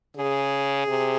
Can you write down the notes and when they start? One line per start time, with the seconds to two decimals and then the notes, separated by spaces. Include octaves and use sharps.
0.16 C#3 G#4
0.88 C3